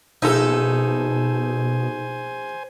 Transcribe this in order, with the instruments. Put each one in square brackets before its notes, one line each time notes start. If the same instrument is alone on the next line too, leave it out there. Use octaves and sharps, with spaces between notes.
[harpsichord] A#1 E5 [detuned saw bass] B2 [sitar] D#4 A4 [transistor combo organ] C5 G#5